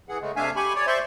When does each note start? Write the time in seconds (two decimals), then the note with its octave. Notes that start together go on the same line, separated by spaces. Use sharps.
0.09 E3 G#4 F#5
0.21 C#3 G#3 A3
0.36 C3 A3 D4 E5 F5 G#5
0.56 G4 G#5 B5 C#6
0.76 C#5 D5
0.87 C5 D5 E5 C6 C#6